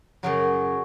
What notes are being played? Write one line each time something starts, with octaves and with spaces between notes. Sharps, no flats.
F#2 C#3 F#3